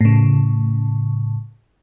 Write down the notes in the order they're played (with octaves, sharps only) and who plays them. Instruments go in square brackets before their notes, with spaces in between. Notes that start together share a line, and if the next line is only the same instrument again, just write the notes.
[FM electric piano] A2 C#3